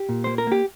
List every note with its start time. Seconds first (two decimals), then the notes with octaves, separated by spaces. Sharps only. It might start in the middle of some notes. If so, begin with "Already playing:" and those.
Already playing: G4
0.09 A#2
0.24 A#3 C5
0.38 A#4
0.47 A#3 G4